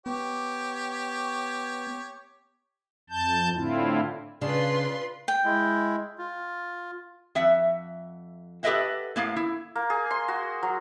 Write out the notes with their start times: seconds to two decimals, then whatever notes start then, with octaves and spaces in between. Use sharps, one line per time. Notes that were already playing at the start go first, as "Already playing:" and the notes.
0.06 B3 G4 C#5
3.10 F2 A5 G6
3.54 A2 D3 C4 E4 F4
4.41 C#3 D4 F4 B4 C6
5.28 G5
5.45 G#3 E4
6.18 F4
7.35 F2 E5 F#5
8.63 G4 A4 B4 D#5 E5 F#5
9.16 A2 A#3 B3 F5
9.36 E4
9.75 A#3
9.90 G#4
10.11 C6
10.28 F#4
10.63 F#3